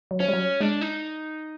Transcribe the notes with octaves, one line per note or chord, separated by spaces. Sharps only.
F#3
F3 C#4
G3
F#3
G#3 D4
D#4